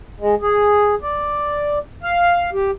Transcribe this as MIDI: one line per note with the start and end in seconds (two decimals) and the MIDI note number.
0.20 0.35 56
0.42 0.95 68
1.02 1.79 74
2.03 2.50 77
2.53 2.71 67